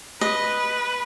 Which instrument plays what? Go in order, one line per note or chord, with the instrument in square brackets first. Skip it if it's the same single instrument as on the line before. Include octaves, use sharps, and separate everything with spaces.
[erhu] B4 [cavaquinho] D#5